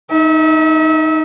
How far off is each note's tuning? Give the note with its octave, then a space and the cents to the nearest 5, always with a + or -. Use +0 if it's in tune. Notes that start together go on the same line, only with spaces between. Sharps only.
D#4 +5 E5 -35